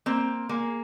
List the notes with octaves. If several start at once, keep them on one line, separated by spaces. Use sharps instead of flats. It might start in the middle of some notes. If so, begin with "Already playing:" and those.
A#3 C4
G#3 A#3